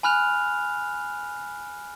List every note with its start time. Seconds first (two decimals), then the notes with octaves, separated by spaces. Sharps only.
0.03 G#5 B5 F6 F#6 F7